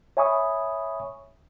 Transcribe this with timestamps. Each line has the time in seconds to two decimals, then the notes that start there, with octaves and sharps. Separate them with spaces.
0.17 C#5 E5 G#5 B5 C#6 D#6